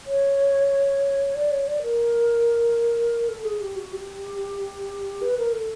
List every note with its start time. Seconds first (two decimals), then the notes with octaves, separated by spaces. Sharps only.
0.06 C#5
1.35 D5
1.51 C#5
1.67 D5
1.83 A#4
3.28 A4
3.44 G#4
3.60 G4
3.76 F#4
3.92 G4
5.22 B4
5.38 A#4
5.53 A4